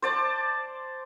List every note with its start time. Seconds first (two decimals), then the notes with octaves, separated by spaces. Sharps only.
0.02 C5 D5 A5